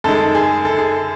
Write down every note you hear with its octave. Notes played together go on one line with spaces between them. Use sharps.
F#2 D#3 G#3 A4
G#4
A4
G#4